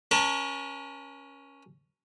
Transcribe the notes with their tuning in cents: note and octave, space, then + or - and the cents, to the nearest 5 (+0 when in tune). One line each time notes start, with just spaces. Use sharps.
C#4 +0 A#4 +45 A5 +25